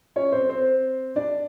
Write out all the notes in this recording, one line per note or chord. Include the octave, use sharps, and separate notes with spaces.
C#4 C#5
C4 C5
C4 C5
D4 D5